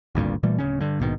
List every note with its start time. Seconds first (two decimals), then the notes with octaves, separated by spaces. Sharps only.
0.15 G#1 D2 G2 A#2
0.43 A#2 E3 G3 A3
0.59 D1 B1 C#3 C#4
0.80 G2 D3
1.00 A#1 G#2 B2 D#3